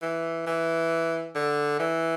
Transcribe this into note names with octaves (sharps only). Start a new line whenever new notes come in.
E3
E3
D3
E3